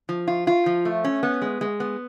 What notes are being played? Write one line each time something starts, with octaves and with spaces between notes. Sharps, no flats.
F3
F4
F4
F3
A3
C#4
B3
G#3
G#3
B3